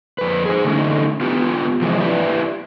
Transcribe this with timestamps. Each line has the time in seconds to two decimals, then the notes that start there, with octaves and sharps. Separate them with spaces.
0.18 F2 B4
0.46 G#4 C5
0.65 D3 A3 C#4 D#4
1.21 B3 F4 G4
1.82 C3 E3 F3 G#3
2.00 E4 G4 B4 D5 E5